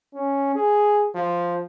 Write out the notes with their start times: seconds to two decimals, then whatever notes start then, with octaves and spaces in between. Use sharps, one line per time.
0.15 C#4
0.56 G#4
1.15 F3